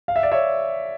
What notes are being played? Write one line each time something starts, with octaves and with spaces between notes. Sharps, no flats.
F5
E5
D5
C#5 E5